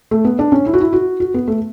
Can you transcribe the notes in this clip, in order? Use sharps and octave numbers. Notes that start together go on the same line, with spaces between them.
A3
B3
D4
C#4
E4
F#4
E4
F#4
F#4
B3
A3